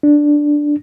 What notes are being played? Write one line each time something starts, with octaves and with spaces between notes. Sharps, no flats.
D4